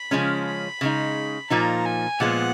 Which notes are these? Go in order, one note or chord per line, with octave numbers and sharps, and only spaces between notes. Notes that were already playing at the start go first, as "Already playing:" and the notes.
Already playing: B5
C#3 F3 G#3 C#4
B5
C#3 G#3 D#4
A#2 F3 A#3 D#4 A#5
G#5
A#2 F3 G#3 B3 F#5